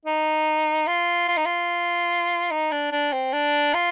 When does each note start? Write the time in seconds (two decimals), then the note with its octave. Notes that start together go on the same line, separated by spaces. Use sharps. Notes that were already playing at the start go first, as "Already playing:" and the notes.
0.05 D#4
0.87 F4
1.28 F4
1.37 D#4
1.45 F4
2.51 D#4
2.71 D4
2.92 D4
3.12 C4
3.33 D4
3.74 F4